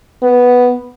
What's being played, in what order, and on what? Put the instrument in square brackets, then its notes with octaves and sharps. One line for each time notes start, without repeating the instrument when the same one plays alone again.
[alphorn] B3